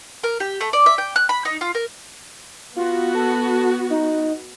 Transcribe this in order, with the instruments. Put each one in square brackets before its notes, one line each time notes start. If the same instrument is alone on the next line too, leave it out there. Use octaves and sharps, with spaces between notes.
[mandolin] A#4
G4
A3
D5
E5
G5
F#6
B5
D#4
F4
A#4
[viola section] B3 F#4 [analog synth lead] F4
[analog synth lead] A4
D#4